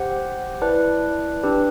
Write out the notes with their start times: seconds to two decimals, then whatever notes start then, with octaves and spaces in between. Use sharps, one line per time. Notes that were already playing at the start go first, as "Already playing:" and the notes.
Already playing: G4 C5 F#5
0.61 E4 B4 D5 A5
1.44 D4 G4 B4